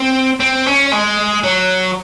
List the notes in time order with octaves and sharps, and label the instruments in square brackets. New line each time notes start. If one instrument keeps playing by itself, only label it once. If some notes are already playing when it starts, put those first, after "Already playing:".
Already playing: [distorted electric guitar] C4
C4
C#4
G#3
F#3